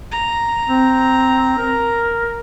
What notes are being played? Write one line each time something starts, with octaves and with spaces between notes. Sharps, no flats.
A#5
C4
A#4